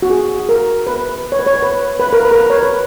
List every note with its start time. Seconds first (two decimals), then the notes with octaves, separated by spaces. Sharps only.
0.02 F#4
0.10 G#4
0.49 A#4
0.87 B4
1.32 C#5
1.39 B4
1.46 C#5
1.62 B4
2.00 B4
2.13 A#4
2.25 B4
2.31 A#4
2.38 B4
2.50 C#5
2.63 B4